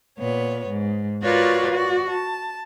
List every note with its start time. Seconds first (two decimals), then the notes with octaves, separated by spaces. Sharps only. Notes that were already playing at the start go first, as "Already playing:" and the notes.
0.19 A#2 B3 C#5
0.68 G#2
1.23 F4 F#4 A#4 B4 C#5 D5
1.71 F#4 D5
2.10 A5